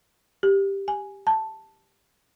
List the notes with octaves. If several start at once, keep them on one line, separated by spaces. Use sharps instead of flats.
G4
G#5
A5